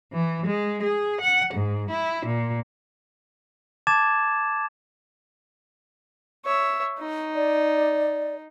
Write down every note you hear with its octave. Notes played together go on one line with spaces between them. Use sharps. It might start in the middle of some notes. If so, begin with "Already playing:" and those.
E3
G#3
G#4
F#5
G#2
E4
A#2
A5 D6 G#6 A6 E7
C#5 E5
D#4
D5